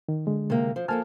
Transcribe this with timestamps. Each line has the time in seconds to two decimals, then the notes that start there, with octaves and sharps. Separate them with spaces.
0.09 D#3
0.27 D3 G#3
0.50 C3 A#3
0.76 F3
0.88 F3 A#3 A4 G#5 A5 F6